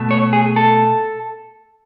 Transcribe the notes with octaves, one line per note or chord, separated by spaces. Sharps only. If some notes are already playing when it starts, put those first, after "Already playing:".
Already playing: B2 A3
C#5
G#4
A4